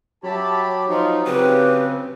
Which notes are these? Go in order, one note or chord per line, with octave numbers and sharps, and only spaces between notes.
F#3 G4 C#5 E5 A5 B5
F3 D#4 F4
C#3 C4 G4 B4